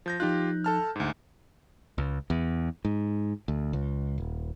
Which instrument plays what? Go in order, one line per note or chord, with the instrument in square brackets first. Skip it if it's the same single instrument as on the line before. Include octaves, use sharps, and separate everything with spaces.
[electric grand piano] F3 G6 A#6
[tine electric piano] F3 D#4 F#6 [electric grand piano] F4 G4
[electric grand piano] A4 A5 F6
D2 G#2
[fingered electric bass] C#2
E2
G#2
D2
C#2
D#1